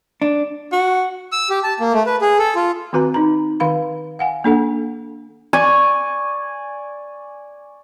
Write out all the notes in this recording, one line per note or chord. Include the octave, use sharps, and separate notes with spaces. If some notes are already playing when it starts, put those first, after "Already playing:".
D4
F#4
E6
G4
A5
A#3
A3
B4
G#4
A4
F4
D#3 C4 F#4 B4 A#5
D#4 A#5
D#3 F5 B5
F5 F#5 G#5
A#3 D4 A4 F#5
D5 G#5 C#6